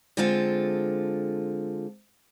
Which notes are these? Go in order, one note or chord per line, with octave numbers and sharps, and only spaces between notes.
D3 G#3 C4 F4 A4